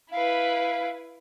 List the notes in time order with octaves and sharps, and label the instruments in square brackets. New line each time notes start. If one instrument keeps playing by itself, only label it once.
[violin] E4 B4 [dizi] F5